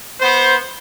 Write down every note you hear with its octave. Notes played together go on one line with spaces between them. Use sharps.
B3 C5